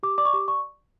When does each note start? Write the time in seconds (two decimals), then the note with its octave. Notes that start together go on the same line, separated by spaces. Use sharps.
0.03 G4 D6
0.18 D5 D6
0.25 C#6
0.33 G4 D6
0.48 D5 C#6